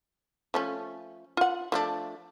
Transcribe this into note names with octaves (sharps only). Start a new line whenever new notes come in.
F3 A3 C#4
F4 F#5
F3 A3 D4